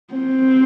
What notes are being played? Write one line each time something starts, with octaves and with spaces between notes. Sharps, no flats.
C4